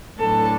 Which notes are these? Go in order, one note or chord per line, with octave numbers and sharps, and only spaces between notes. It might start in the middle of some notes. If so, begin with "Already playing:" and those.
A2 F#3 B3 D4 A4